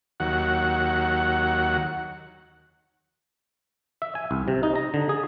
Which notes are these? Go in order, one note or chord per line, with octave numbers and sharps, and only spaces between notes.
D#2 F#3 F#5
E5
G#5
C2
C3
D#4
A#5
D3
G#4